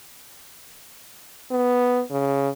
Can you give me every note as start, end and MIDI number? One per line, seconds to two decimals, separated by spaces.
1.51 2.02 59
2.11 2.50 49